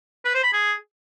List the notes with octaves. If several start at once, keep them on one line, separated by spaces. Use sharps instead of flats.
B4
C5
B5
G#4